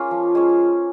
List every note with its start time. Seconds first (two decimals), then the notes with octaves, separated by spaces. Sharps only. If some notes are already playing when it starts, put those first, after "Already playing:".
Already playing: G#3 A#3 C#4 F4
0.11 F3
0.35 G#3 C#4